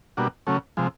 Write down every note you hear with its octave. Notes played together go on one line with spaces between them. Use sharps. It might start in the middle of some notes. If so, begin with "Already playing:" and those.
B2 G3 A#3 D4 F#4
C#3 F#3 A3 C#4
C3 F3 G#3